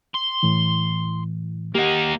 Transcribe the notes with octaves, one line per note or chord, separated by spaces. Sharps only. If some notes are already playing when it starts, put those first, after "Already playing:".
C6
A2 E3
A#3 D#4 G4 F#5